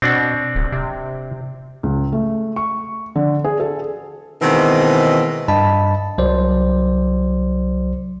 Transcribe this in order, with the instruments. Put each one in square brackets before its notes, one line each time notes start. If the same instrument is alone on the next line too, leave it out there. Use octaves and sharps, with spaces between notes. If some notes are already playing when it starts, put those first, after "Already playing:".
[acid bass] B2 [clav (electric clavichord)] C4 D4 F#5
[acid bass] D1
C3
[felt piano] C#2
A3
C#6
D3
G#4
A4
[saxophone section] B2 D#3 E3 G#3 A#3 C4
[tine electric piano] G2 D#5 A5 B5
C2 F#3 C5 D5